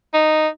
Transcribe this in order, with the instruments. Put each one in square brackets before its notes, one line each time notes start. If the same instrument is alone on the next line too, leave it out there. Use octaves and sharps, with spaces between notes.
[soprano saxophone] D#4